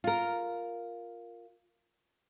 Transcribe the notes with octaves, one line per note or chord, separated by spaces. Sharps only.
F4 A#4